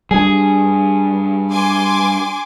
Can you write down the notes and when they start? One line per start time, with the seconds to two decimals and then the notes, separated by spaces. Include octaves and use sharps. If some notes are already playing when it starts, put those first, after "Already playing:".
0.11 G3 D4 G#4
1.50 G#5 C6 D6